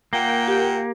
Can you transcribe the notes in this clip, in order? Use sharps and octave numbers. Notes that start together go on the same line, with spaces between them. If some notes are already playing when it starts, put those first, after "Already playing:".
A#2 A#3 F#5 G5
G4 A#4